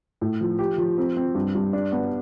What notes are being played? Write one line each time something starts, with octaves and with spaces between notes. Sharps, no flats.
A2
F3
G4
F3
C4
C4
G2
G2
D4
B3